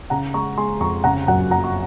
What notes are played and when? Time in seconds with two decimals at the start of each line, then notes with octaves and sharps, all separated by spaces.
0.10 C#3 F#5 A#5
0.34 G#3 A#5 C#6
0.58 G#3 G#5 C6
0.80 F2 A#5 C#6
1.04 C#3 F#5 A#5
1.27 F#2 F#5 A#5
1.51 F#3 F#5 A#5
1.64 C#6